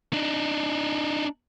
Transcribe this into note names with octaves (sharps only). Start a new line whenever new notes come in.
D4 D#4